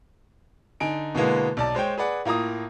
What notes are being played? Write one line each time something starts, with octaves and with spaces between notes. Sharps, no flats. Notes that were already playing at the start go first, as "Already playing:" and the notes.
D3 D#4 G#5 D7
B2 D3 E3 G#3 A#3 B3
B1 D5 A5
G#3 C5 C#5 G5
G#4 B4 D5 F#5
A2 A#3 F4 A#5 D#6